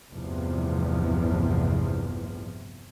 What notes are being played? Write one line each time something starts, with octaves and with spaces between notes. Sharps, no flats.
A1 E2 G2 C3 F3